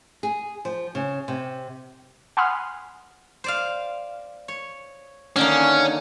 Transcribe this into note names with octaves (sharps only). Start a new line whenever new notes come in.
G#4
F3
C#3
C3
F#5 G#5 B5 C6 D#6 F6
C5 D5 F5
C#5
D3 D#3 A#3 C#4